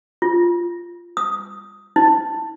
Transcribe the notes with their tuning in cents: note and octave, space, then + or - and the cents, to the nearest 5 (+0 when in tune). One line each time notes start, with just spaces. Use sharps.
F4 -10
D#6 +10
E4 -45